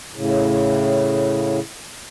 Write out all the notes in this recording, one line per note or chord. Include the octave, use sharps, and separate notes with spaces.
A2 C#3